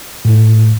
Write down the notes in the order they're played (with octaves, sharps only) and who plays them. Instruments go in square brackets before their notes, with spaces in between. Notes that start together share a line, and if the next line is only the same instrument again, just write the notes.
[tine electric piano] A2